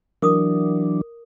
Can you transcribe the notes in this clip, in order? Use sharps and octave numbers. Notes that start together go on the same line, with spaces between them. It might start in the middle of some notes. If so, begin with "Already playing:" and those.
E3 F#3 D4 A#4 D6 D#6